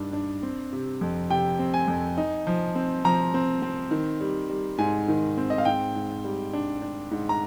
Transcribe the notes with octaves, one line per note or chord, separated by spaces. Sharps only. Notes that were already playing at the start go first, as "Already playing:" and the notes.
Already playing: G2 D#3 D4
D4
C4
C3
F2
C3 G5
C4
G#5
F2
D#4
F3
C4
F3 A#5
C4
C4
D#3
G3
G3
G#2 G#5
D#3
C4
D#5
F5
G#2 G5
G#2
G3
D4
D4
G#2
A#5